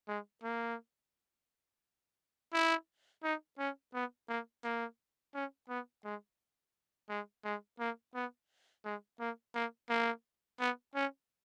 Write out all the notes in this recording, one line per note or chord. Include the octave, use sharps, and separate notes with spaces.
G#3
A#3
E4
D#4
C#4
B3
A#3
A#3
C#4
B3
G#3
G#3
G#3
A#3
B3
G#3
A#3
A#3
A#3
B3
C#4